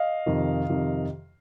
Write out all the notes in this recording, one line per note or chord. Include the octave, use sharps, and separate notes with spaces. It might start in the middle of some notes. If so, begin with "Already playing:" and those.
Already playing: D#5 F5
F2 C3 D#3
F2 C3 D#3